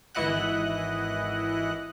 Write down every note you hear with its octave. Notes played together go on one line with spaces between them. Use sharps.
G#1 E3 E4 D#5 F#5 F#6